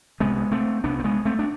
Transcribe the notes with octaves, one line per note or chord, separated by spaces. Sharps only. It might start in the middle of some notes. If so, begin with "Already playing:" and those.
C2 C3 G#3 B3
A3 C4
C2 C3 B3 D4
C4
G#3 B3
A3 C4
D4